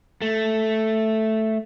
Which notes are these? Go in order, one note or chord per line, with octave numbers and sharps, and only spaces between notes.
A3